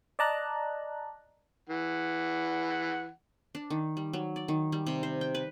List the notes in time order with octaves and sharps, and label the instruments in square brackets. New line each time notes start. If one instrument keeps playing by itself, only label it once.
[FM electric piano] D5 D#5 A5 A#5 F#6
[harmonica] E3 F#5
[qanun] D4
D#3
G3
F#3
D5
D#3
G3
C3
C5
G5
B4